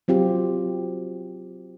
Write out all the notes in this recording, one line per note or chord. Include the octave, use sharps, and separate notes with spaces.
F#3 C4 F4 G4